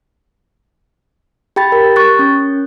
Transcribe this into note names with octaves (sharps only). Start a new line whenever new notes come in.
G4 G5 B5 A6
A#4
C#6 F#6 A6
C#4